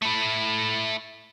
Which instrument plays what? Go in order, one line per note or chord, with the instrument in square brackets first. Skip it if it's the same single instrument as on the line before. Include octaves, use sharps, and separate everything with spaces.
[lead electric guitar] A3 E4